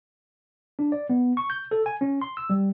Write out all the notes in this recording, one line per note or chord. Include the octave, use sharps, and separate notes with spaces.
D4
D5
B3
C#6
G6
A4
G#5
C#4
C6
E6
G3